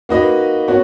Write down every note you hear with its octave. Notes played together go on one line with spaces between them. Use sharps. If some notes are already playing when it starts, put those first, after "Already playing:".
A#3 D#4 F#4 B4 D#5
B3 F#4 C#5